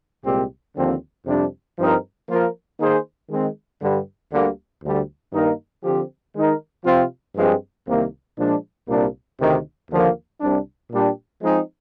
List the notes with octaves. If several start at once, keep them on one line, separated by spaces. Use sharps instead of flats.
C2 A#2 G#3 C4 G4
D#2 D3 F3 C4
F2 C3 G3 D4
G2 F3 C4 D#4 A#4
F3 A#3 F4 A#4
D#3 A#3 D#4 G#4 C5
D#3 G#3 C4
G2 D3 G3
D2 D3 G3 A#3
D2 D3 G3
G2 D#3 A#3 D#4 A#4
D3 F3 C4 G4
D#3 G#3 D#4 A#4
C3 F3 C4 F4
G2 F3 G#3 C4
C2 C3 D#3 A#3
A#2 F3 G#3 D4
C2 A#2 G3 A#3 D4
D2 C3 D#3
D#2 D3 F3 A#3
C2 C3 G3 D4
A#2 G3 D4 G4
F3 G#3 C4 D#4 G#4